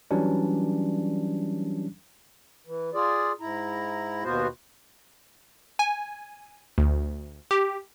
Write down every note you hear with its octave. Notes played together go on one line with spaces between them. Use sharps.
E3 F#3 G3 C#4 D4
E3
F4 G#4 D5
G#2 E4 A#5
D#2 B2 B3 F4 F#4 C5
G#5
D2
G4